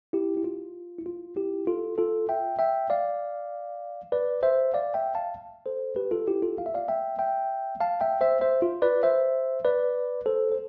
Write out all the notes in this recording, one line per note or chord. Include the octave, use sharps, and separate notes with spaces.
E4 G4
E4
F4
E4
F4
E4 G4
F4 A4
F4 A4
E5 G5
E5 G5
D5 F5
B4 D5
C5 E5
D5 F5
E5 G5
F5 A5
A4 C5
G4 B4
F4 A4
E4 G4
F4 A4
F5
E5
D5 F5
E5 G5
E5 G5
F5 A5
E5 G5
C5 E5
C5 E5
F4
B4 D5
C5 E5
B4 D5
A4 C5
C5